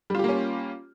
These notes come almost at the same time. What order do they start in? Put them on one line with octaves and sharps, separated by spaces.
G3 F4 G4 A#3 C#4